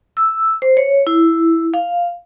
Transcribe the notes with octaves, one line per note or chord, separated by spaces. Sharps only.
E6
C5
C#5
E4
F5